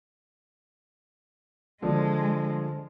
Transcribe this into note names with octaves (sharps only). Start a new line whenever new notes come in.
D3 F3 G#3